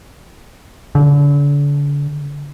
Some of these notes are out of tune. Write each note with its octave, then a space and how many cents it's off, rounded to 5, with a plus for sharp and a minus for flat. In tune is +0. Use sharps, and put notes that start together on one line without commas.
D3 -35